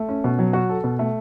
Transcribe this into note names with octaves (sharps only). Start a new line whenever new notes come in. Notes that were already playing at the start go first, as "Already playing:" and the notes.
Already playing: A3
C#4
B2
F#3
F#4
A4
B2
A3